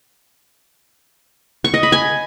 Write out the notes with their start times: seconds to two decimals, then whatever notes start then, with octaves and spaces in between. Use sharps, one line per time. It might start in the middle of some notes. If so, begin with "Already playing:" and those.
1.64 C#6
1.74 D#5
1.83 B5
1.92 G#5